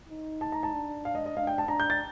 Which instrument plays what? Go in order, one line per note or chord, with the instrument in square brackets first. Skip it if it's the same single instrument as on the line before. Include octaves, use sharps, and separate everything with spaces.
[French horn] D#4
[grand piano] A5
A#5
A5
[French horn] D4
[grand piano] F5
D#5
D#5
[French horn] D4 [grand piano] F5
[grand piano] G5
A5
[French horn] D4 [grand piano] A#5
[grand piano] G6
A6